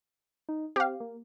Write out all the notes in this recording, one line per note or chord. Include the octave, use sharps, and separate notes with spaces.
D#4
C4 G4 F5
A#3